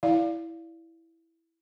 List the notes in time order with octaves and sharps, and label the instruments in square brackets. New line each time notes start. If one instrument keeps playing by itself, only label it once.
[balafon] E4 D5 F5